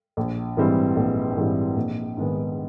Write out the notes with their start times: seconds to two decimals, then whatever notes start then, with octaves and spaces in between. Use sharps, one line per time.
0.17 A#1
0.57 G#2 E3 G3 C4
0.96 A#1
1.36 G#2 E3 G3 C4
1.77 A#1
2.17 G#2 D#3 G#3 B3